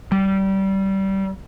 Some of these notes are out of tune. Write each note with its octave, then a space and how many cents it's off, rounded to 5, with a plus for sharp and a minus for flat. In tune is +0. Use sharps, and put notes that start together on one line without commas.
G3 -20